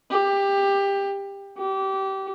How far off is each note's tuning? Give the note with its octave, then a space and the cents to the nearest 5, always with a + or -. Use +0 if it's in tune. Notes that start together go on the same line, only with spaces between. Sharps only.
G4 +20
G4 -25